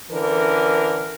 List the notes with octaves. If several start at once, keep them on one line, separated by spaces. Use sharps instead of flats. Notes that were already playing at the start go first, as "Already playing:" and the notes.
D3 E3 C#4 A#4